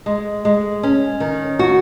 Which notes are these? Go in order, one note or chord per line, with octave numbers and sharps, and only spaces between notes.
G#3
G#3
C#4
D#3
F#4